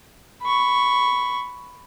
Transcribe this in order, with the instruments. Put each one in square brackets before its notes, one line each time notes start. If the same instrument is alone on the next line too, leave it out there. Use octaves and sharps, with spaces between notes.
[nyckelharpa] B5 C#6